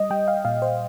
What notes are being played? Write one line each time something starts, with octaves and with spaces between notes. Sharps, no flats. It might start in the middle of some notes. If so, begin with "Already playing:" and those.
Already playing: G3 D#5
G3 G5
F5
A#2 F5
C5